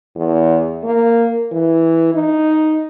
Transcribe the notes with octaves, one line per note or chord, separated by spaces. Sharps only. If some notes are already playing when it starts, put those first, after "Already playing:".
E2
A#3
E3
D#4